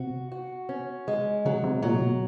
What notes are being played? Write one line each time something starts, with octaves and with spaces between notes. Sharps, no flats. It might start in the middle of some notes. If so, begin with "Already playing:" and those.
Already playing: C3 F#4
F#4
C#4
G#3
C#3 F#3
C3
A#2 F#3
B2